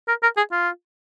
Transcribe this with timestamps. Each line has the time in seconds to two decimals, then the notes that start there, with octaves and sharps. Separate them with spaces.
0.08 A#4
0.23 A#4
0.37 G#4
0.52 F4